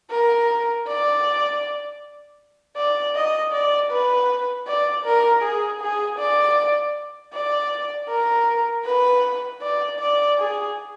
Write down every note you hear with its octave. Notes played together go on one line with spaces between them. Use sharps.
A#4
D5
D5
D#5
D5
B4
D5
A#4
G#4
G#4
D5
D5
A#4
B4
D5
D5
G#4